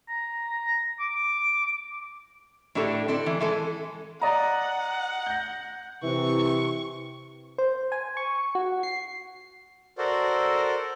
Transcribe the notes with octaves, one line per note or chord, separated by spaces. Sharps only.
A#5
D6
A2 D4 E4 G4 A4
C4 A4 D5
E3
E3 G#3 A4
D5 D#5 F#5 A#5
G6 A#6
C3 E3 C#6
C5
G#5
C#6
F#4
C7
F#4 A4 A#4 C5 D5